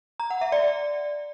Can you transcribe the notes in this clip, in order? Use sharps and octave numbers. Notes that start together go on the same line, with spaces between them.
A#5
F#5
E5
D5